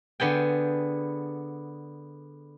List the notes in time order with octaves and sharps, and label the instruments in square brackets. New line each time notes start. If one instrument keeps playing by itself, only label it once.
[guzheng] D3 B3 G#4 G5